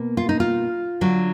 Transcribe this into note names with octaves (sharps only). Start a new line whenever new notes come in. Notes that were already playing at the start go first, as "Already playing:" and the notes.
Already playing: B2 A#3
F4
D#4
F4
D3 F#3 D4